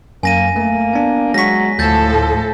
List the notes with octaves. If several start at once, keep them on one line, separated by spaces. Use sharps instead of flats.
F#2 A#3 G#5 A#6 D#7
A3 A#3
B3 D4
F#3 G#3 C#6 A#6 B6
D2 A2 F3 A4 A5 G6 A6